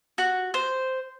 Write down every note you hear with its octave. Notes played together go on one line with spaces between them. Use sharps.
F#4
C5